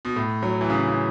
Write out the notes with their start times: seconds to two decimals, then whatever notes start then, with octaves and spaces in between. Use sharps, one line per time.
0.05 B2
0.16 A2
0.43 F#3
0.61 E3
0.70 C#3
0.87 C#3